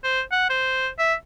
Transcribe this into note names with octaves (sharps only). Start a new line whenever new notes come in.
C5
F#5
C5
E5